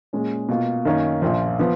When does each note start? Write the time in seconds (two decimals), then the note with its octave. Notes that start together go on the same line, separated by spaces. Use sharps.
0.13 A#2 G#3 C#4
0.49 B2 A#3 F4
0.85 F#2 D#3 A#3 C#4
1.22 A#1 A#2 F3
1.59 F3 B3